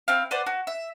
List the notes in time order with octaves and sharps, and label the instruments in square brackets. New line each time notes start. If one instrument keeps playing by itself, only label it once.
[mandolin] C4 E4 F5
B4 C5 D5 F#5
F#4
E5